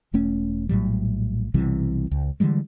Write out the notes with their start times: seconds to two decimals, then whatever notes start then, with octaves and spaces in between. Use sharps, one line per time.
0.13 E1 A3 C#4
0.69 A#1 A2 F#3 G3
1.54 B1 C3 E3 G3
2.11 C#2
2.40 D3 E3 G3 G#3